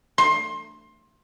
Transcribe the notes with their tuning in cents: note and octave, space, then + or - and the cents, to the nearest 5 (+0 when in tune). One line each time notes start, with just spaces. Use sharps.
C6 +20